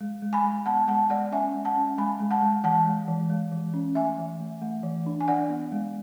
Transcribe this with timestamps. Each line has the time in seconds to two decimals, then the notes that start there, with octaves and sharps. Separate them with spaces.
0.01 G#3
0.22 G#3
0.33 G#5 B5
0.44 G#3
0.66 B3 F#5 A5
0.88 G#3 F#5 A5
1.10 G#3 D5 F#5
1.32 C#4 E5 G#5
1.55 G#3
1.65 F#5 A5
1.76 C#4
1.98 G#3 G#5 B5
2.20 G#3
2.31 F#5 A5
2.42 G#3
2.64 E3 F#5 A5
2.86 G#3
3.08 E3
3.30 G#3
3.52 E3
3.74 C#4
3.95 A3 E5 G#5
4.18 E3
4.40 A3
4.62 A3
4.83 E3
5.06 D4
5.21 G#5
5.28 D4 D5 F#5
5.50 B3
5.72 G#3